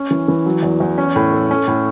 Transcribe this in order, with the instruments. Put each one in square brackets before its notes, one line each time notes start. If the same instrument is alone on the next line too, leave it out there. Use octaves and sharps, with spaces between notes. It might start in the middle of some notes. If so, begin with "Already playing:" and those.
Already playing: [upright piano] C#4
E3
E3
F#3
E2
E2
C#4
A2
A4
C#4
A2